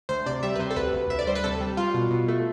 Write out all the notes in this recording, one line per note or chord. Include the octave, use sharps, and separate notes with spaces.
D2 C5
C3 D5
G3 E5
B4
C3 C5
A4
D2 B4
D2
D2 E5
D5
G3 C5
B4
C3 A4
G3
G3 F4
B2
B2
A3